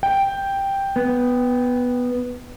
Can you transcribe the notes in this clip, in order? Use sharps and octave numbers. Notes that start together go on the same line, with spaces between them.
G5
B3